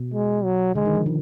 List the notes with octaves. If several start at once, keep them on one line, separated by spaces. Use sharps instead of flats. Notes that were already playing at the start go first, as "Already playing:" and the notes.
Already playing: B2
G#3
F#3
D3 G#3
D#3
F3
D#3